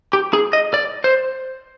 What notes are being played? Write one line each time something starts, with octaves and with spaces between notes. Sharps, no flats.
G4
G#4
D#5
D5
C5